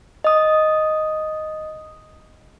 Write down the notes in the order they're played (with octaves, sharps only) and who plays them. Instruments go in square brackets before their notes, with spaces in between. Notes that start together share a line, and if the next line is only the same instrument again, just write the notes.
[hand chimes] D#5 D#6